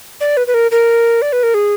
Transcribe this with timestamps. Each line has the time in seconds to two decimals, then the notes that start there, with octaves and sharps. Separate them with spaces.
0.21 D5
0.37 B4
0.47 B4
0.54 A#4
0.71 A#4
1.22 D5
1.33 B4
1.43 A#4
1.54 G#4